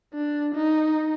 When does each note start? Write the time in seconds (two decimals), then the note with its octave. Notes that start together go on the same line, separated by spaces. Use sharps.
0.14 D4
0.55 D#4